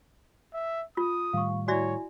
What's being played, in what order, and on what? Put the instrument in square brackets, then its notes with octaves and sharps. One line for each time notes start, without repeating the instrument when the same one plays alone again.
[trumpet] E5
[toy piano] F4 [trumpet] D#6
[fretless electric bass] A2 D#3 G3 [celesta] F5 C#6
[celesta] E4 G#5 [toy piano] F#4 D5 E5 [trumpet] C#5